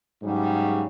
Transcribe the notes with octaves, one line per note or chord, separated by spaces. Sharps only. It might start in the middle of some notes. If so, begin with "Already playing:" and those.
G#2 C#3 F#3 G3